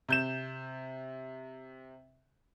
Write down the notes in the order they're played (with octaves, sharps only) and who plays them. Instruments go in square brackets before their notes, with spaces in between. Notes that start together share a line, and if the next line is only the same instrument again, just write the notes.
[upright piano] C3 G6 E7